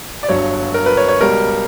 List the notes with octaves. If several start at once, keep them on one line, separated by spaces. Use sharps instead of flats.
D5
G1 G2 F#3 C#5
A#4
B4
C#5
C#5
C#2 B2 G3 A#4